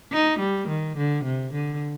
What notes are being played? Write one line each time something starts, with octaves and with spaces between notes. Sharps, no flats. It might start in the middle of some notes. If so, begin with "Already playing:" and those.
D#4
G3
D#3
D3
C3
D3